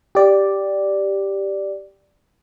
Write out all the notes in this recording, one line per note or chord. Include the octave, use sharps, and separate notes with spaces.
G4 D5